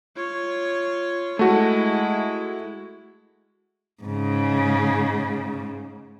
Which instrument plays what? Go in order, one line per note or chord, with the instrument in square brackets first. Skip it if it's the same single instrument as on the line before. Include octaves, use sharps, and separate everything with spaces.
[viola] F4 C#5
[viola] G#3 E4 [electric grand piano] A3 F#4
[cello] G#2 C#3